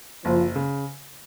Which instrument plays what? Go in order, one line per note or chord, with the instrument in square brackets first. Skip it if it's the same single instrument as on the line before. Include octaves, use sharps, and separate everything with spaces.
[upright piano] F#1 [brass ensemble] F3
[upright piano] C#3